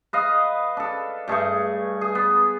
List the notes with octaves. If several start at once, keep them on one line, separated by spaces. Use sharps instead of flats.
B4 D#5 F5
D4 A4
G2 A3 G#4 C#6
G#4
B3